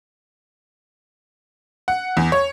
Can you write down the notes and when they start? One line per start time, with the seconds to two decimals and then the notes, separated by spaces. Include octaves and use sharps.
1.88 F#5
2.17 E2
2.32 C#5